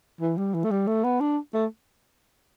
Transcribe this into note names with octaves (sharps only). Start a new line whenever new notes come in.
E3
G3
E3
A3
G3
A3
B3
D4
A3